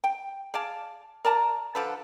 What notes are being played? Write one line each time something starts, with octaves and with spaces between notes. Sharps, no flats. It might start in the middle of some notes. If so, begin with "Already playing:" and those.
G5
G#4 D5 F5 A5
A#4 D5 A5 A#5
D3 F3 A4 B4